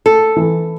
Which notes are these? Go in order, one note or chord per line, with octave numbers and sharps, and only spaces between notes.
A3 A4
E3